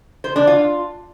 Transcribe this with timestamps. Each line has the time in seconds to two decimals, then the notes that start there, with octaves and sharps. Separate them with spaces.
0.24 C5
0.36 D4
0.47 F4